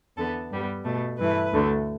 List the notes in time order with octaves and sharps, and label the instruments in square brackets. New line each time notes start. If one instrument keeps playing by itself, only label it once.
[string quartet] E2 D3 B3 A4
G2 G3 B3
B2 A3
G2 E3 A3 B4
D2 D3 A3